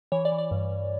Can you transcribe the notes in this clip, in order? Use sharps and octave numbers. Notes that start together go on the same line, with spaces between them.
E3 C#5
D5
E3
D5
G2
G2